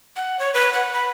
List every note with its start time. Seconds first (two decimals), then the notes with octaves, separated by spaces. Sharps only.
0.16 F#5
0.39 C#5
0.54 B4
0.73 F#5
0.93 B5